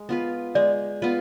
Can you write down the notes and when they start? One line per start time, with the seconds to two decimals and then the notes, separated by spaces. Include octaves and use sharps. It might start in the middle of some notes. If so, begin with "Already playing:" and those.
Already playing: G#3
0.09 B3 F4 B4
0.55 G#3 D5
1.02 B3 F4 B4